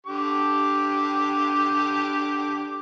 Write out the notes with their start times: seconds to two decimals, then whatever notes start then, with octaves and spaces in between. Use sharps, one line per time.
0.06 D3 G4 D6